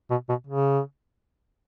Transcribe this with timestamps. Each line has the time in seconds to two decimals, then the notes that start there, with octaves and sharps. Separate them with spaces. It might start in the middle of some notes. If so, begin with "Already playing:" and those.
0.10 B2
0.29 B2
0.47 C#3